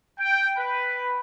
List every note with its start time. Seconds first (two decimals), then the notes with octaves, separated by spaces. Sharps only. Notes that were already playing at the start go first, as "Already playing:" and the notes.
0.19 G5
0.57 B4